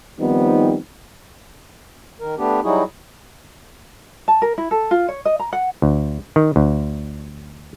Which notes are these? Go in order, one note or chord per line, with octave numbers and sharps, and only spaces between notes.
D#3 F3 G3 B3 C4 D#4
D#3 A#4
A3 B3 D4 G4
F#3 G3 D#4 E4 F#4 G#4
A5
A#4
E4
A4
F4
C#5
D#5
A#5
F#5
D2
D#3
D2